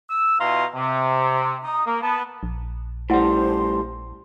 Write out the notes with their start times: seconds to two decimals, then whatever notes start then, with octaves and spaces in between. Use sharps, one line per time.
0.10 E6
0.40 B2 E4 F4 F5 A#5 C6
0.75 C3
1.64 D#4 D#6
1.86 A#3
2.02 B3 A5
2.43 A#1
3.10 A2 G3 E4 C5 F#5 A5 C6